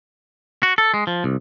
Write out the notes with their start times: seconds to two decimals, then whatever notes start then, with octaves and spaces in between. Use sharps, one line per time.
0.63 F#4
0.78 A4
0.94 G#3
1.07 F3
1.24 C2